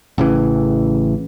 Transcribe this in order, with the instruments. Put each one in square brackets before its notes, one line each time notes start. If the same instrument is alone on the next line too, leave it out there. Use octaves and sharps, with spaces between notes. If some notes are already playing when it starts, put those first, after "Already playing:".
[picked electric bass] A1 C#3 E3